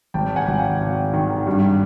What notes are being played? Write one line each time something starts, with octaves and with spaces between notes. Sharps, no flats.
G#1 G5 A5
F#5 G#5
G#1
F5 G5
G#1
D#3
G2